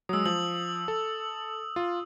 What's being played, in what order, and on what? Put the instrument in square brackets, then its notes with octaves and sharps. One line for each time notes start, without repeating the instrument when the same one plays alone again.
[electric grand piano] F#3 G#3 [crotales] D#6 E6
[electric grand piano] F3 [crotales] F#7
[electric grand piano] A4
F4